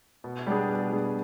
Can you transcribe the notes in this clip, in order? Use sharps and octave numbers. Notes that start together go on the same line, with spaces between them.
B2
G3 B3 D4 G#4
B2
G3 B3 D4 G#4